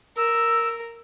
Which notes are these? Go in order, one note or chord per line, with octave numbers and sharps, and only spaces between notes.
A#4 E6